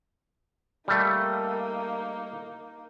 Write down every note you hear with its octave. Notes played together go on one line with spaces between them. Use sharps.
G3 A3 A#3 D#4